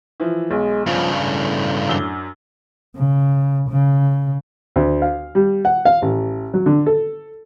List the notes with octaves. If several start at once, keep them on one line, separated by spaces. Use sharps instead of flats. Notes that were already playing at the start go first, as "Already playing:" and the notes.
E3 F3
B1 G#3
G2 C#3 F3
A2
F#2 D4 G7
C#3
C#3
D2
F5
G3
F#5
F5
A1
F#3
D3
A4